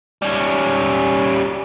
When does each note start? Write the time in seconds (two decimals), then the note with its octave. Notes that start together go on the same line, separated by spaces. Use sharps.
0.22 G3 C#4